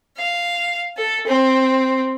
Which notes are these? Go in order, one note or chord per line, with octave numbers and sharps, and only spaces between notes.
F5
A4
C4